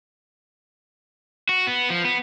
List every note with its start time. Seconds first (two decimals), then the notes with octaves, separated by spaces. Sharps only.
1.49 F#4
1.67 B3
1.90 F3
2.05 B3